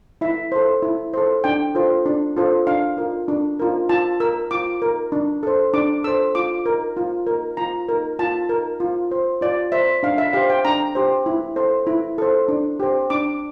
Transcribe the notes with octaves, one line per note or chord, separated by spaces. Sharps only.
E4 E5
A4 C5
E4
A4 C5
D4 G5
F4 A4 C5
D4
F4 A4 C5
D4 F5
F4 A#4
D4
F4 A#4
F4 A5
A#4 E6
F4 D6
A#4
D4
A4 C5
D4 D6
A4 C5 E6
F4 D6
A#4
F4
A#4
F4 A#5
A#4
F4 A5
A#4
F4
C5
F4 D5
C5 E5
D4 F5
E5
G4 C5 F5
G5
D4 A#5
G4 C5
E4
A4 C5
E4
A4 C5
D4
G4 C5
D4 D6